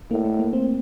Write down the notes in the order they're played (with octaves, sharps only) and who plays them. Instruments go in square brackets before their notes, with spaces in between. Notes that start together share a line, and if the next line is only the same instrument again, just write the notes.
[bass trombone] A2 [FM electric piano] A#3
[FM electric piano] A3
A#3
C4